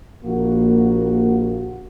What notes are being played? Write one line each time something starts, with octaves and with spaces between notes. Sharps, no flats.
A#1 A#3 F#4